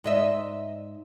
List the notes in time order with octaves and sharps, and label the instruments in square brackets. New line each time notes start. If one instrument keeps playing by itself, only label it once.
[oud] G#2 D#5 E5